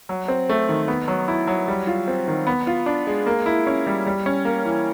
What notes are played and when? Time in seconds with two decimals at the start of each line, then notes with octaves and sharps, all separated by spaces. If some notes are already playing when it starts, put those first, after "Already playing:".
0.09 F#3
0.28 C4
0.49 A3
0.69 D#3
0.88 B3
1.08 F#3
1.28 E4
1.47 F#3
1.68 G3
1.87 F4
2.08 C4
2.28 D#3
2.47 B3
2.67 F4
2.86 D4
3.07 G#3
3.26 A#3
3.46 E4
3.67 C#4
3.87 G3
4.06 G3
4.26 C#4
4.45 A#3
4.65 E3